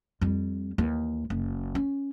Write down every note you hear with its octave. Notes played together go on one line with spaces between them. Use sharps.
F2 G3
D#2 E3
F#1
C#4